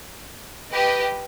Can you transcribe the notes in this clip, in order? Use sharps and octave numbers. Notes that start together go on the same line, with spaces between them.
G4 B4 D#5